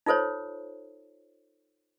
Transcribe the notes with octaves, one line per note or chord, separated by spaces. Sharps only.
D#4 F4 A4 C5 C#5